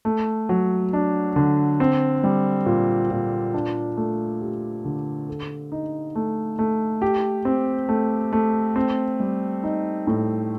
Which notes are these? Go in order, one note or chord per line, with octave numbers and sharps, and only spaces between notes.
A3
F#3
D4
D3
C4
G3
A#2
A#2
D4
A3
G4
D3
A4
D#4
A3
A3
G4
C4
A3
A3
C4
G3
D#4
A2